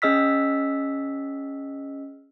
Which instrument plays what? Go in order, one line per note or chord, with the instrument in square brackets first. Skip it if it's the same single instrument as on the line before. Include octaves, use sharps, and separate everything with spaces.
[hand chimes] C#4 G#4 D#5 E6 F6 B6